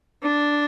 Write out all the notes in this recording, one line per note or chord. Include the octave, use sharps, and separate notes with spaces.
D4